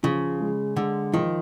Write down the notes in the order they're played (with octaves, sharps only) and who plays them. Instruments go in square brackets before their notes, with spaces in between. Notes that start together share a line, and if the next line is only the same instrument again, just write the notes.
[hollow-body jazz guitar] C#3 [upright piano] F3
[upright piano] G#3
[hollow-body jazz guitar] D3 [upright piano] G#3
[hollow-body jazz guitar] D#3 [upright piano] F3